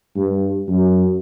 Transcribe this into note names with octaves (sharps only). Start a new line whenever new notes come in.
G2
F#2